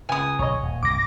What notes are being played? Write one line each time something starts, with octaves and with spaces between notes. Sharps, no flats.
C#2 G#5 D#6
B1 D3 C#5 D#5
D#1
C2 G2 A#2 D6 A#6